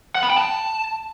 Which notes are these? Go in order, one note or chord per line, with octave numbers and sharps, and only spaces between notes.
F#5
B5
G5
A5